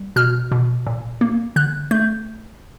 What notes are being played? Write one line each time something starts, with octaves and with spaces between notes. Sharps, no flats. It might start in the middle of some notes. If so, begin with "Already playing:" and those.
Already playing: G3
B2 F6
B2
A#2
A#3
D3 F#6
A3 G6